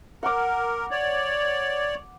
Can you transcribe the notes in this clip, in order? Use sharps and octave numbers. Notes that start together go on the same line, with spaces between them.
A#4 F#5 D6
C#5 D5